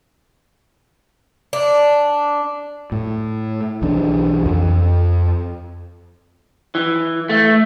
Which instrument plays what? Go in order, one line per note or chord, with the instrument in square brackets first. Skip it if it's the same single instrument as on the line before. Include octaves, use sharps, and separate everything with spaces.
[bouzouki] D4
[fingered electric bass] A2
B1 E3 D4
F2
[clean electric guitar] E3
A3